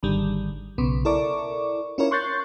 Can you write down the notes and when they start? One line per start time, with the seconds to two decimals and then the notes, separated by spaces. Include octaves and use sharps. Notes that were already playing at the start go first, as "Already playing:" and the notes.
0.03 G#1 D3 D#3 G3
0.78 B1 C#3 B3
1.05 E4 A4 A#4 D5 C#6 D6
1.98 C#4 E4 F4 A#4 C#5
2.11 C6 C#6 F#6 G6 A6 C7